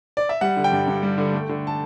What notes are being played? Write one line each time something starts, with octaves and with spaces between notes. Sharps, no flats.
D5
E5
G3 F#5
D3
G5
G2
G2
G3
D3
A3
D3
A5